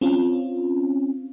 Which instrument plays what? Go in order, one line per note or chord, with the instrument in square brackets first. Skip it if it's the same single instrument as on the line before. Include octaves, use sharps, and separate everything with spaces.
[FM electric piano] C4 C#4 F4